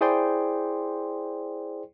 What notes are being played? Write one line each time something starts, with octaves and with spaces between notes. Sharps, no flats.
E4 G#4 C5 D5 G5 C6